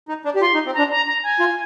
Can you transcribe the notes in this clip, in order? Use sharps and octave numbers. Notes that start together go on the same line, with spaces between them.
D#4
D4
G4
F4 C6
D#4
C4
D4 A#5
A#5
A#5
G#5
F4